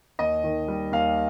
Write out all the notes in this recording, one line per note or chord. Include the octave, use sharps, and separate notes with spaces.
D#2 D#5
D#3
G3
D#2 F5